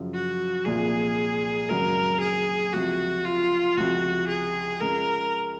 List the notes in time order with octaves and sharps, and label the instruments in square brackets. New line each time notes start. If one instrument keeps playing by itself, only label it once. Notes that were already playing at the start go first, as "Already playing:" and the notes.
Already playing: [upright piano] F#2 C#3 F3
[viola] F#4
[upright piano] C2 A#2 F3 [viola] G#4
[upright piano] G#1 F#2 C#3 F#3 [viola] A#4
[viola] G#4
[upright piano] C#2 C3 F3 [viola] F#4
[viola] F4
[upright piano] C#2 C3 F3 [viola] F#4
[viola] G#4
[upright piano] C#2 C#3 G#3 [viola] A#4